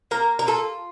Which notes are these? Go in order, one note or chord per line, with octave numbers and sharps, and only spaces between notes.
A#3 A#4
A#4
F4 A4